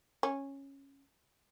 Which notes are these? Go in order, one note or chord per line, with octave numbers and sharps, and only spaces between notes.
C#4